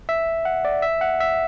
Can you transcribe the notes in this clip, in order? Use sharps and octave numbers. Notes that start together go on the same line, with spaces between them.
E5
F#5
D5
E5
F#5
E5